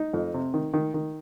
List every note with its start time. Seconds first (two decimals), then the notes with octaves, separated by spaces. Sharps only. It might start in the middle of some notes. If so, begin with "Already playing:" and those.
Already playing: D#4
0.13 F2
0.34 C3
0.54 D#3
0.74 D#3
0.94 D#3